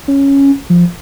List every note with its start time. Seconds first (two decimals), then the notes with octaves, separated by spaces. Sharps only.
0.08 C#4
0.70 F3